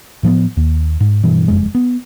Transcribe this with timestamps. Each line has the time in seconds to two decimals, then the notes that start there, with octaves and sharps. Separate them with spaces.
0.23 A2 F3 A#3 B3
0.57 D#2
1.00 G#2
1.23 G2 B2 E3
1.48 F#1 F2 G#3
1.75 B3